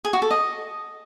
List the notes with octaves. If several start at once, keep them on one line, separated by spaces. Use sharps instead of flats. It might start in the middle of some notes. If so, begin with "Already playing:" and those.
G#4
F#4
A4
D#5